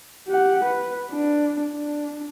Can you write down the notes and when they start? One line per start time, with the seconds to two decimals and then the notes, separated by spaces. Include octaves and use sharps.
0.27 G4 F#5
0.64 B4
1.11 D4
1.73 D4